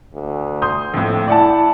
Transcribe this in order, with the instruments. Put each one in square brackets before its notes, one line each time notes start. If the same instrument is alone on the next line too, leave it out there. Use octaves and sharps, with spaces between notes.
[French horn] D2
[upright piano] C6 D#6 G6
[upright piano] A#1 A2 [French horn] F2
[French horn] E4 [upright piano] D5 F#5 A5